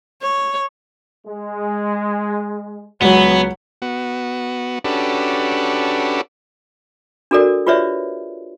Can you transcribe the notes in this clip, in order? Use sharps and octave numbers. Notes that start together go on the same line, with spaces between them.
C#5
G#3
C#2 F#3 B3
B3 F#4
C#4 D4 F#4 G4 A4 B4
D4 F#4 A4 A#4 D5
F4 G4 B4 C#5 D5 E5